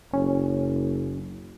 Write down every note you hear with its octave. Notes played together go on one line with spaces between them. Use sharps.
F#1 C#4